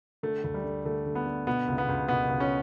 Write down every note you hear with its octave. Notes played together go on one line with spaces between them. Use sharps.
D3 A3
D2
G3
D3
D3 A3
D3
B3
D3
B2 B3
C#2
B3
C#2
B2 B3
C#2
C#4